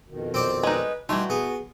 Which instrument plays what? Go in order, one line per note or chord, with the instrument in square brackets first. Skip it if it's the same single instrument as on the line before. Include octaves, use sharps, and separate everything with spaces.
[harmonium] F2 B2 D#3
[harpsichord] C4 D5 [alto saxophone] C5
[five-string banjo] G#3 D#4 [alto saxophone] B4
[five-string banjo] E3 A3 [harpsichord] G3 C6 [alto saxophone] D#4 [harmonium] F#4
[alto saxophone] B3 [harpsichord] G#4